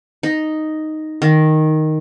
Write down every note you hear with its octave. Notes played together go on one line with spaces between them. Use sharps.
D#4
D#3